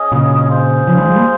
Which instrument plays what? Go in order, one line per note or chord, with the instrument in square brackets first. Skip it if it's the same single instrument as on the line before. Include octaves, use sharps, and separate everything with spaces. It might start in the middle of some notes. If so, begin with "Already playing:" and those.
Already playing: [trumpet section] C#4 G#4 D#5
[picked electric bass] A#2 C#3
[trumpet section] F4 G#4 C5
[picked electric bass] C#3 F3
D#3 G3
F3 G#3
G3 A#3